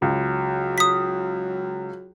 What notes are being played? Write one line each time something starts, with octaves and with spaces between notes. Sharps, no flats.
C#2 F#3
D#6 B6